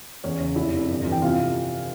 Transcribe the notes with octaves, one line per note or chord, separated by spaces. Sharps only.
E2 C#4 C#5
C#3
F1 E4 E5
F1
G1
E3
G5
C3 F4 F5